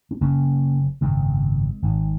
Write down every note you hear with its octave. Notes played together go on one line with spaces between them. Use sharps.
C4
F#1 F#2 C#3 A#3 C#4
G#1 F#2 C#3 G#3 C4
G#1 G#2